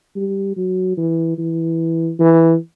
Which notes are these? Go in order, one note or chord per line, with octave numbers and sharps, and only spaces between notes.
G3
F#3
E3
E3
E3